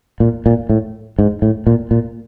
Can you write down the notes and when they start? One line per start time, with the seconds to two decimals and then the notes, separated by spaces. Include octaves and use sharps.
0.20 A#2
0.46 A#2
0.69 A2
1.19 G#2
1.42 A2
1.67 A#2
1.91 A#2